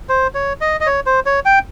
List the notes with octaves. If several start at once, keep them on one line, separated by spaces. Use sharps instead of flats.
C5
C#5
D#5
D#5
C#5
C5
C#5
G5